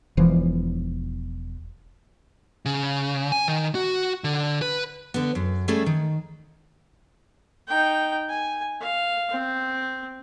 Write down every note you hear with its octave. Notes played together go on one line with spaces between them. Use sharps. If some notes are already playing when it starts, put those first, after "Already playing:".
E1 E3 F3
C#3
G#5
D#3
F#4
D3
B4
D3 B3
F#2
G3 A3 C#4 G#4 A4
D#3
D#4 G5
G#5
F5
C4